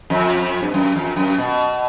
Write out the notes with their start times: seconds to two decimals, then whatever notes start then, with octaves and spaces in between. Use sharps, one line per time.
0.10 F2
0.63 G2
0.74 F#2
0.96 F2
1.16 F#2
1.38 B2